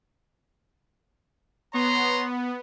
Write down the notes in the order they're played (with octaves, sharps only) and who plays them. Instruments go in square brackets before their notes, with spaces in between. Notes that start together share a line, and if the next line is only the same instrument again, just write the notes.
[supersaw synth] B3 [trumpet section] C#5 A#5 C6